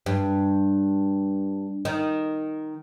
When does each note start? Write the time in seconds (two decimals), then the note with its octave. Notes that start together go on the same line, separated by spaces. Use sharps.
0.06 G2
1.85 D#3